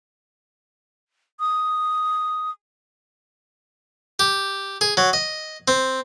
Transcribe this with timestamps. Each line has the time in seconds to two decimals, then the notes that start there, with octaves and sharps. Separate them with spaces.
1.40 D#6
4.19 G4
4.81 G#4
4.97 F#3
5.13 D#5
5.68 C4